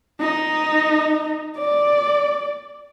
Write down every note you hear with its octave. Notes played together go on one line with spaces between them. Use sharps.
D#4
D5